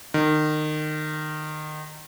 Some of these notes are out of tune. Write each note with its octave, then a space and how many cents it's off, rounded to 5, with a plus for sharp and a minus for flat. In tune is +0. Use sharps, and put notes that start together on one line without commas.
D#3 -25